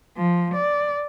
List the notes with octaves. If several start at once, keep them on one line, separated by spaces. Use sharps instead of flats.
F3
D5